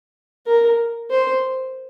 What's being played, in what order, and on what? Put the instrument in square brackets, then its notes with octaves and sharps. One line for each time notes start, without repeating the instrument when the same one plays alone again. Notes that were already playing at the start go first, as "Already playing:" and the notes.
[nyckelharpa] A#4
C5